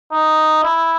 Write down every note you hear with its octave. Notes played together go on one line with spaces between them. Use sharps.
D#4
E4